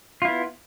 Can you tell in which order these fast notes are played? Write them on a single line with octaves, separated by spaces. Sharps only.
F4 E4 B3